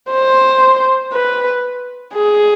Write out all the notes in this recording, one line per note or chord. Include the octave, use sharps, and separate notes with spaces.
C5
B4
G#4